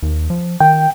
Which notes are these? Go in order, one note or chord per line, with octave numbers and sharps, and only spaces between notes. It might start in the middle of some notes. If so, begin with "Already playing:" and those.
D#2
F3
D#3 G5